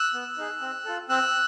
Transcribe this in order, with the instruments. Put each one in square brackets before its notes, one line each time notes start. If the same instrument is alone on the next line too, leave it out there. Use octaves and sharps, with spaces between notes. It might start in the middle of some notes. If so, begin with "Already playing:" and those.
Already playing: [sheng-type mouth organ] E6 F#6
B3
D#4 G#4
C4
F4 A4
C4 E6 F#6